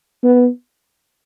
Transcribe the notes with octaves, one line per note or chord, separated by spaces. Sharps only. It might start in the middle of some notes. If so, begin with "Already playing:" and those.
B3